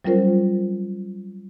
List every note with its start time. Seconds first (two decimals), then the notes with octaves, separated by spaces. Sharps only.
0.05 F#3 G3 C#4 F4 A#4 C5